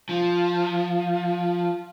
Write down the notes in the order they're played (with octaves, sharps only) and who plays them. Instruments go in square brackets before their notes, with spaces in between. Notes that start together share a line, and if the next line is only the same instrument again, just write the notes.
[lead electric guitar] F3